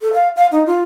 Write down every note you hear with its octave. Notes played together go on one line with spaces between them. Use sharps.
A4
F5
F5
D#4
F4